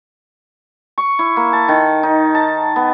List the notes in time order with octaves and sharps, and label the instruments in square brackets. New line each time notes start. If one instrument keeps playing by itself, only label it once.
[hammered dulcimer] C#6
E4
A#3
A5
D#3
D#4
A5
B3